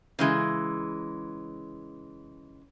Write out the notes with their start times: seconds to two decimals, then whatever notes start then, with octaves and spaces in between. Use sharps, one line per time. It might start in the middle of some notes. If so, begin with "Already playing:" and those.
0.19 C#3 E3 G#3